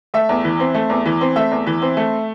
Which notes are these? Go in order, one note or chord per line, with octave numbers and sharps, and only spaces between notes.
A3 E5
E2
E3
C4
A3
E2
E3
C4
A3 E5
E2
E3
C4
A3